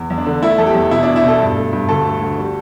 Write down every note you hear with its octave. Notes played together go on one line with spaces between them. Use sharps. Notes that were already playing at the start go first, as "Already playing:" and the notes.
Already playing: E2
E2
D4
D3
A3 E4
E2 A4
G4
E2
B2 E4
B2 D4
E4
B2 A4
G2
A3
G2
D2 A4
A3
D2
G3